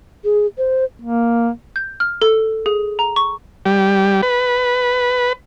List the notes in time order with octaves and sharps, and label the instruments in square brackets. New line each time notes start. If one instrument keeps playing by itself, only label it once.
[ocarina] G#4
C5
[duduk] A#3
[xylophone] G6
F6
A4
G#4
A#5
C#6
[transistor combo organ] G3
B4